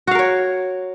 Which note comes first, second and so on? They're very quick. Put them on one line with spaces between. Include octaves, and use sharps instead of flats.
F#4 F5 A#4 C#5